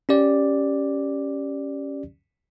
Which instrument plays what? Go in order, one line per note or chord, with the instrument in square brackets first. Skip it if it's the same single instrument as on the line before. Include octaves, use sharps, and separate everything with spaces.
[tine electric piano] C#4 G4 D5